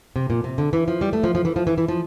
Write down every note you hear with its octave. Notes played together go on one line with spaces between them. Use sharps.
C3
A#2
C3
D3
E3
F3
G3
A3
F3
F3
E3
F3
E3
E3
F3